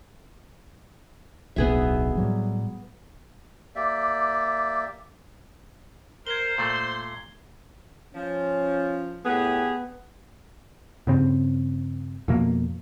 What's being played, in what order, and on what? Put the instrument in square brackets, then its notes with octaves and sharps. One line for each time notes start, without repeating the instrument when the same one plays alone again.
[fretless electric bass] D1 B1 D4 [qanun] B3 G#4 E5
[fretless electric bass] A2 F#3 G3
[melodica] A#3 G4 D5 E5
[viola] A#4 [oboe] C5 [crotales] G#6 C7 G7
[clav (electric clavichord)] A#2 A3 [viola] C6
[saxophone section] F3 [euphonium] C#4
[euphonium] A2 [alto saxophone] B3 [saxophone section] G4 G#4
[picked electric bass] G2 C#3 C4
F2 B2 A#3